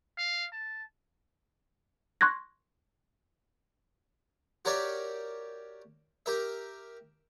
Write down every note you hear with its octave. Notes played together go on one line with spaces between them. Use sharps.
F5
A5
C6 C#6 F#6 G#6 A#6
F#4 G4 A#4 C#5 D5 E5
G4 A#4 E5